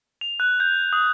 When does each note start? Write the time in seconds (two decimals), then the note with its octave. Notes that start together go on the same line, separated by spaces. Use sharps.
0.21 F7
0.40 F#6
0.60 G6
0.93 D#6